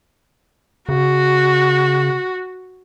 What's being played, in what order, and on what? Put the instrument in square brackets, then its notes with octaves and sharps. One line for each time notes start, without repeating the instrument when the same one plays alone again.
[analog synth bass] C#3 [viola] F#4